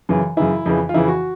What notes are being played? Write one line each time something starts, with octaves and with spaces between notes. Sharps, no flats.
F#2 C#3 E3
F#2 C#3 E3 E4
F2 C#3 E3
F4
F2 C#3 E3 E4
F#4